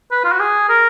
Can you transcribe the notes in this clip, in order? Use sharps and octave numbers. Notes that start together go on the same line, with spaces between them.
B4
F4
F#4
G#4
A#4